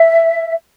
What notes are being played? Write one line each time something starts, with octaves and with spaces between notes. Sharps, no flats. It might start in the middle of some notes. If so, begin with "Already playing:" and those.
Already playing: E5